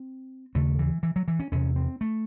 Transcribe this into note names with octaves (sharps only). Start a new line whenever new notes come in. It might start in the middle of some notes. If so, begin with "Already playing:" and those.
Already playing: C4
D#2 C#3 A3
E3
E3
F#3
E3
C#4
E2 C3 C#4
C4
A3